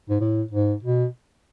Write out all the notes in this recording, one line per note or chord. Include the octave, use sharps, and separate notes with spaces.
G#2
A2
G#2
B2